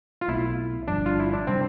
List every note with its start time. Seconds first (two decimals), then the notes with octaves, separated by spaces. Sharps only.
0.21 F4
0.28 B1 B2 A3 C4 E4
0.88 G1 G2 F3 D4
1.06 F4
1.20 E4
1.33 D4
1.47 C3 G3 C4 D4